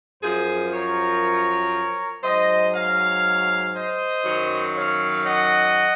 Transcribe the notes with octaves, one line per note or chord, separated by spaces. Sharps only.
F#2 F3 G#4 C5
A#4 C#5
G#2 F#3 C5 D#5
C#5 F5
C5 D#5
F#2 D#3 F#3
C#5 F5
D#5 F#5